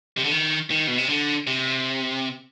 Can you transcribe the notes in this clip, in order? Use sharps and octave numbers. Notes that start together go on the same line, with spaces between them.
C3
D3
D#3
D#3
B2
C3
D3
C3